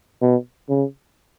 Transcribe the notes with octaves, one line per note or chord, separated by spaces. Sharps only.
B2
C#3